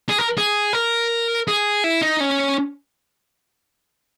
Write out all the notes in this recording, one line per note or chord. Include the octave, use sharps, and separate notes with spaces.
G#4
A#4
G#4
A#4
G#4
E4
D#4
C#4